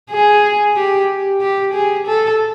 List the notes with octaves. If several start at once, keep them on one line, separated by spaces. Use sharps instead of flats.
G#4
G4
G4
G#4
A4